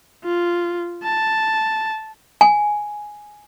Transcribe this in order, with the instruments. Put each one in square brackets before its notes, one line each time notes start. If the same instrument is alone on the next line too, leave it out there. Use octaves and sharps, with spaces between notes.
[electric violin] F4
A5
[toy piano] G#5